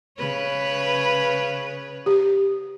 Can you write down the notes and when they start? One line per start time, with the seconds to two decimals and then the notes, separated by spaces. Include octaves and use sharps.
0.18 C#3 B4 C#5
2.06 G4